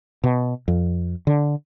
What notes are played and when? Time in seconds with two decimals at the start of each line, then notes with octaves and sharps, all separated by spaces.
0.24 B2
0.68 F2
1.27 D3